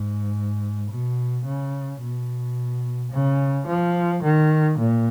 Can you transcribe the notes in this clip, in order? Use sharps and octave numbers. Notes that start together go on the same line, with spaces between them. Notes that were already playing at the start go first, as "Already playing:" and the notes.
Already playing: G#2
B2
C#3
B2
C#3
F3
D#3
A#2